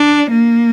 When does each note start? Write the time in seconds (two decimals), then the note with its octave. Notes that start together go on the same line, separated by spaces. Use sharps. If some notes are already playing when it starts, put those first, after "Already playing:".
Already playing: D4
0.30 A#3